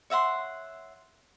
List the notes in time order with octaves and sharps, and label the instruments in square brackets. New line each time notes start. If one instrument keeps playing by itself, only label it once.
[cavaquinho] C#5 E5 F#5 C6